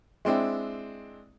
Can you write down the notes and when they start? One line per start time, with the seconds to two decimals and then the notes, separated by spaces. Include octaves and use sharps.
0.25 G#3 C4 D4 E4